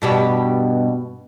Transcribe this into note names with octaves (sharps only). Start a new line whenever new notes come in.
G2 B2 G4